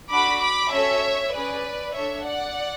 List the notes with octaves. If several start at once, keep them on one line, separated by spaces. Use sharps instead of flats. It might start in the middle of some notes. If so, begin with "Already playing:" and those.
D4 F#4 A4 B5 D6
B5 D6
C#4 F#4 A4 C#5 E5
C#4 G#4 B4 D5
D4 A4 C#5 E5
D5 F#5